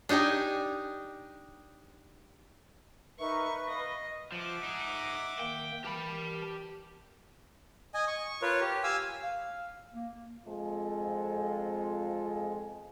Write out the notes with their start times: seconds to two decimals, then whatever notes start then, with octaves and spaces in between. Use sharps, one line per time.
0.09 D4 D#4 G4 G#5
3.19 D#4 A#4 B4 E5 C#6
3.67 D#5 F5
4.32 F3 E5 F#5 D6
4.63 D#4 G#4
5.39 D#3 A#3 G5
5.85 E3 G4 A#4 A5 B5
7.94 D#5 G#5
8.07 C#6
8.42 F4 A#4 B4 C#5
8.61 G4
8.84 F5 G#5 E6
9.23 F5
9.93 A#3
10.47 F2 G#3 C4 F4 A4